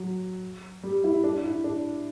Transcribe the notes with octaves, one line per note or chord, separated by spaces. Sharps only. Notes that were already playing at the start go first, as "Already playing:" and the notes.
Already playing: F#3
G3
E4
D4
E4
D4